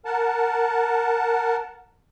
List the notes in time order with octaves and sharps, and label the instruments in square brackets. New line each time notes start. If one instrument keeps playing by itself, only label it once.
[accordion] A#4 F#5 A5